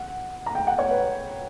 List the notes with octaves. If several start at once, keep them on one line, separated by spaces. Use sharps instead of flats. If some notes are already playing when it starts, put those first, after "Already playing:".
Already playing: F#5
A#5
G5
F#5
C#5
B4